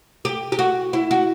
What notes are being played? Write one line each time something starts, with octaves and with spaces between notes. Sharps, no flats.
G4
G4
F#4
E4
F#4